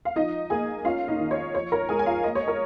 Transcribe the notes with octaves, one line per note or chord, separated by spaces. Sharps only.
F5
F3 D#4 D#5
A#3 G#4 G#5
C#4 F4 F5
D#4 D#5
D#3
C#5
F3 C#5
A#4 A#5
G#3 G#4 G#5
G#5
F4 F5
A#3 D#5
C#5
A#4